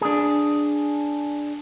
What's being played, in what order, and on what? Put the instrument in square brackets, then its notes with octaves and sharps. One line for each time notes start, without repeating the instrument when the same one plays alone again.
[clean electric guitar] D4 G#4